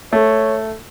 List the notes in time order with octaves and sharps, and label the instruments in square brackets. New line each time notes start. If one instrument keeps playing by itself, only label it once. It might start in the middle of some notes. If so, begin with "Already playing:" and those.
[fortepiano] A3 [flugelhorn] C#5